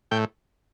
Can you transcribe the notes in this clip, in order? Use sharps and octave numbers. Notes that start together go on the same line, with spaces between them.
A2 G5